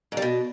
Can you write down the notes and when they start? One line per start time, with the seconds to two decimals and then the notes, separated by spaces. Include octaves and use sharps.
0.12 G#2
0.17 G3
0.22 B2